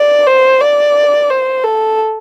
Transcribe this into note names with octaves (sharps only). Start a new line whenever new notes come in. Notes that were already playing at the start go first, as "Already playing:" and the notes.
Already playing: D5
C5
D5
C5
A4